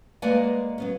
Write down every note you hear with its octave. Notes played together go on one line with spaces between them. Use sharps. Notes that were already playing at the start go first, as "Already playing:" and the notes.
G#3 A#3 B4 D5 F#5 G#5
F#3 B3 C#4